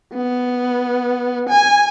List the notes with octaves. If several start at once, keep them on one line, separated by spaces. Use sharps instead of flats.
B3
G#5